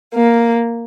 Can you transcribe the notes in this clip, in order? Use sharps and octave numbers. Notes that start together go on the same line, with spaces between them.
A#3